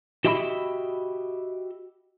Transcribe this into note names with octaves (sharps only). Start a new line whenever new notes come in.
F#4 G4 D#5 E5 A#5 B5